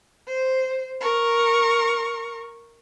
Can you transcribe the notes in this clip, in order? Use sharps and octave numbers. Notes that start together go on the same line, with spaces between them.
C5
A#4 C#6